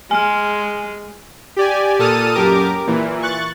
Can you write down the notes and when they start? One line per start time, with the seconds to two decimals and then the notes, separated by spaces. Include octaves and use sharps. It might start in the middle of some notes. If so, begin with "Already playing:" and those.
0.11 G#3 G#5 F6
1.56 G4 D5 G#5
1.99 A#2 A4 A5 D#6 F6 D#7
2.35 F#2 G4 A#4 D6
2.87 A#2 E3
3.22 C#6 F#6 A6